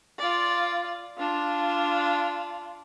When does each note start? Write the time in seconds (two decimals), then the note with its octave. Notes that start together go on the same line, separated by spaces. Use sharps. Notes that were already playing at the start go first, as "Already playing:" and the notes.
0.19 F4 D5
1.18 D4 F4